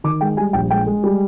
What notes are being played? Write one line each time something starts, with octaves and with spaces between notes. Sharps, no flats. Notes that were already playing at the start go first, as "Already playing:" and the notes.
D#3 D6
G#3 G5
G3 G#5
A#1 G5
G#3 G5
G#3
G3